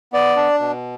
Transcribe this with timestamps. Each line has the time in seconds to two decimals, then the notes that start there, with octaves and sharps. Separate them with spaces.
0.13 B3 D5
0.36 D4
0.60 B2